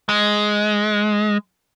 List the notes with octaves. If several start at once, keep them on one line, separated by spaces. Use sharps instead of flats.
G#3